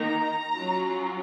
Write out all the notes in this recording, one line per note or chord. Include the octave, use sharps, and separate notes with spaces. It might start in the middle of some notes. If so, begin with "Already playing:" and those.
Already playing: D#3 A#3 D#4 A#5
F#3 C#4 F4